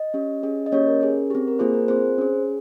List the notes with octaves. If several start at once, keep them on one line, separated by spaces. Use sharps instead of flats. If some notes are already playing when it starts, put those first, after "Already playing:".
Already playing: D#5
C#4 G4
C#4 G#4
D#5
A#3 C#4 G4 C#5
A#4
C#4 G#4
C4 G4
A#4
A#3 F4 G#4 C5
A#4
C4 F4 G#4 C5
C#4 G#4